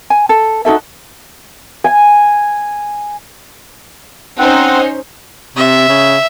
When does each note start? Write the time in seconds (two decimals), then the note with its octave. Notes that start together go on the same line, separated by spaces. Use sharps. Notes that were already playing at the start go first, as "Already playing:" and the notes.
0.10 G#5
0.29 A4
0.65 D#4 F#4 A4 E5
1.84 G#5
4.38 C4 C#4 D#4 C5 F#5
5.56 C3 E5
5.89 C#3